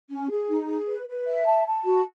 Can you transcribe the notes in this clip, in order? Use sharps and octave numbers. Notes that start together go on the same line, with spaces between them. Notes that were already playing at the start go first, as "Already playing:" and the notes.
C#4
G#4
D#4
G#4
B4
B4
E5
A5
A5
F#4